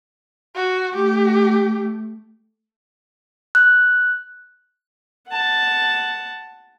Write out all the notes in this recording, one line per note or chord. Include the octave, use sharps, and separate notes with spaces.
F#4
A3 G4
F#6
F#5 A5